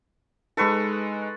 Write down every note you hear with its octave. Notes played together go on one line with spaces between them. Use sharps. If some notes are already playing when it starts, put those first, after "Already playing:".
G#3 D#4 A4 B4 C#6